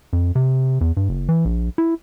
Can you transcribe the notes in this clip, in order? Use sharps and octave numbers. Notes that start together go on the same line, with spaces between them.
F2
C3
E2
G2
F#1
E3
A#1
E4